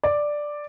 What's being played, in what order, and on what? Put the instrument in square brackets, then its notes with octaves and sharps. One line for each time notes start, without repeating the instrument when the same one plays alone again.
[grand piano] D5